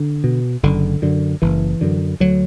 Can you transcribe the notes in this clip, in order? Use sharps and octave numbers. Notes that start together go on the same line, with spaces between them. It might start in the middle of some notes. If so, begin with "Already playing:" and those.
Already playing: D3
B2
F#1 D3
F#2 D3
F#1 E3
F#2 D3
D2 F#3